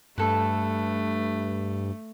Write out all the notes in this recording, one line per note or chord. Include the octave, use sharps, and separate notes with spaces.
G2 A3 A4 B4